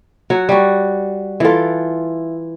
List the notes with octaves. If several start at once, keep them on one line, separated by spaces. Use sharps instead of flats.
F#3 F#4 C#5
G3 F#4
E3 E4 F4 A4